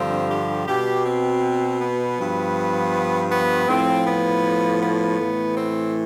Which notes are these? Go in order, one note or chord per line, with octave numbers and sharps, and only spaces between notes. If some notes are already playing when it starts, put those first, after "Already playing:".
Already playing: G2 D3 F3 C4
G4
B2 G4
C4
B3
G2 F3
B3
A2 F3 C4
B3
B3
A2 E3
C4